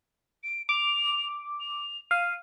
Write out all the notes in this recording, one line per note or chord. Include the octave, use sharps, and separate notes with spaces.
D7
D6 F7
F7
F5 D#7